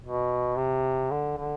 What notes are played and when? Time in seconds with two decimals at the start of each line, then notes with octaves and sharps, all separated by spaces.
0.03 B2
0.57 C3
1.11 D3
1.37 D3